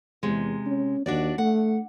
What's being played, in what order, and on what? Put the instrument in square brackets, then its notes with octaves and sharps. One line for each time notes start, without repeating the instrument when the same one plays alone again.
[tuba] E2 [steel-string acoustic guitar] C3 G#3
[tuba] C#4
[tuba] D#2 [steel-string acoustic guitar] D4 F#4 D5
[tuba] A3 [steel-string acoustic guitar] F#5